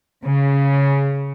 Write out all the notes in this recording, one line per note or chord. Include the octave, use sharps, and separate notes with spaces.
C#3